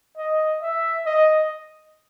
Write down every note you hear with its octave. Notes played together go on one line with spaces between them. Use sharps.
D#5
E5
D#5